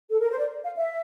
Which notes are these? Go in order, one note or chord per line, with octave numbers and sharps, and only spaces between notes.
A4
A#4
C5
D5
F5
E5